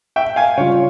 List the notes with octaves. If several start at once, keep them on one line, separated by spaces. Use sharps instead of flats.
E5 G5
F5 G#5
C#3 G3 C#4 F4 C#5 F5